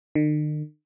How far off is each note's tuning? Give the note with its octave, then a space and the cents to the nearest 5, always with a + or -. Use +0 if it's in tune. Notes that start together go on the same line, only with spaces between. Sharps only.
D#3 -45